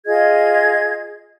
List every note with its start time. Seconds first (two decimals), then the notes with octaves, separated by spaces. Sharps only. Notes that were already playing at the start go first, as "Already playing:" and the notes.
0.06 F4 G#4 D#5 G#6